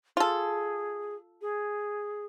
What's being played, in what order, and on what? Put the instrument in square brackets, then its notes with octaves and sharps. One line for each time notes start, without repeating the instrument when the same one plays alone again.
[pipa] F4 A4 [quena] G#4
[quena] G#4